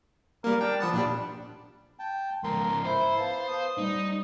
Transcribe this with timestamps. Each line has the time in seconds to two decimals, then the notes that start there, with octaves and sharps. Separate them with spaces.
0.44 G3 A#3 A#4
0.61 D4 G5
0.80 F3 B3 F#5 A5
0.93 A#2 G3 D4 G4
1.99 G5 A5
2.44 C#2 G#2 A#4 C6
2.85 E4 C5
3.17 B3 F5 A5
3.48 D#6
3.79 G3 D#4